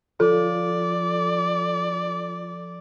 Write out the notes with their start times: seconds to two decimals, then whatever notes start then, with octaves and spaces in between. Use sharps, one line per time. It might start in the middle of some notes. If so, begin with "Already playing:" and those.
0.20 F3 F4 A4 D5